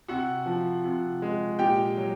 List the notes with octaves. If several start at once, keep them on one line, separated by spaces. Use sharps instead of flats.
C3 F#4 F#5
F3
C3
G#3
A#2 G4 G5
F#3